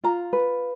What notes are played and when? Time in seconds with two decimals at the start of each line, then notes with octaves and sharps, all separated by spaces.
0.04 F4 A#5
0.33 B4